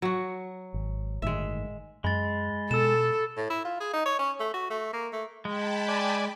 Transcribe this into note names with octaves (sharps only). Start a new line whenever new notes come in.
F#3 F#4
G#1
G1 A2 D#3 G#3 E5
F#2 G#3 B5 A6
B2 A4 E6 E7
A2
E4
F4
G#4
D#4
C#5
C#4
A3
F#4
A3
A#3
A3
G#3 G5 A5 B5
D5 G#5